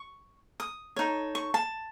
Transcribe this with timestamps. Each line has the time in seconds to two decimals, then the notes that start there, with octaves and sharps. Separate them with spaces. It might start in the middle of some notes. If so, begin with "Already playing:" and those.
Already playing: C#6
0.60 D#6
0.96 D#4 A4 C#5
1.35 C#6
1.54 A5